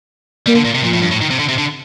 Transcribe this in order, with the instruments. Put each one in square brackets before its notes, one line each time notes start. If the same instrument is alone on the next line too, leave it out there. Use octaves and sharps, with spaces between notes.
[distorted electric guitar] G3 [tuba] A#3
[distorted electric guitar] D3
A#2
C3
[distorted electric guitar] A#2 [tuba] F3
[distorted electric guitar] A2
G2
A2
D#3
C3
D3
C3
D3